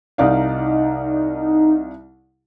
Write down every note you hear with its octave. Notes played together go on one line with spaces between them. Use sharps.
C2 D#4 D5 F5